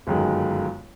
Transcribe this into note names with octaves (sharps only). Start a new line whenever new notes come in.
G1 F#2 D#3 G#3